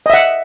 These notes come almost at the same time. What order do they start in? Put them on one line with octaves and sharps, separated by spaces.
D#5 E5 F#5